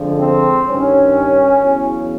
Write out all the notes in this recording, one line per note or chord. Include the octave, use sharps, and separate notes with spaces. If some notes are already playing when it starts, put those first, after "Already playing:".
Already playing: F2 D3 F3 G#3
C4
G2 D#3 G3 C#4
E2 C#3 F#3